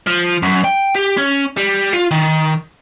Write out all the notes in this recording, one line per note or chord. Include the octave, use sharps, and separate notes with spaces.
F3
F#2
G5
G4
C#4
G3
F4
D#3